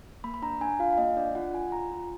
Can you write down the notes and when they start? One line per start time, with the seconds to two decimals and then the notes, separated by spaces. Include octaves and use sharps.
0.24 A#3 B5
0.34 B5
0.42 D4 A#5
0.61 D4 G#5
0.79 F4 F5
0.93 F5
0.98 A#3 D#5
1.17 D4 D5
1.35 F4 F#5
1.54 F4 G#5
1.72 F4 A#5
1.91 F4